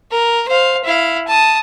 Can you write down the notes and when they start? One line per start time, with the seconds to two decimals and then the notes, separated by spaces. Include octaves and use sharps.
0.11 A#4
0.48 C5 F5
0.84 E4 F5
1.28 A5 D#6